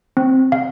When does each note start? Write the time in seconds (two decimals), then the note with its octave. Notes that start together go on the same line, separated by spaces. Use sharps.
0.17 C4
0.52 F5